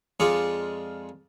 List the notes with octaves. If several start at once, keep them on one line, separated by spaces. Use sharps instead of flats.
F2 G#3 F4 G#4 D5 C#6